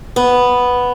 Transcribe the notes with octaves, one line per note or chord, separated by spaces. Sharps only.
B3